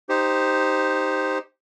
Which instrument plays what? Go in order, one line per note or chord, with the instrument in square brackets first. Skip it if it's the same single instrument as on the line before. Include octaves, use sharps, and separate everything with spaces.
[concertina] D#4 G4 C5